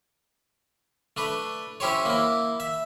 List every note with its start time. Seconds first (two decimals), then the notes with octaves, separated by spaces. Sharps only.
1.17 A3 D4 B4
1.80 C#4 E4 G4 C5 C#5
2.05 A#3 E4
2.60 E5